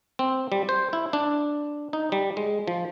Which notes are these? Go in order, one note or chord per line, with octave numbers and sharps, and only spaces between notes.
C4
G3
C5
E4
D4
D#4
G3
G#3
F3